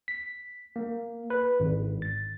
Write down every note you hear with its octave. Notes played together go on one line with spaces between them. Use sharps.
B6
A#3
B4
G#1
A6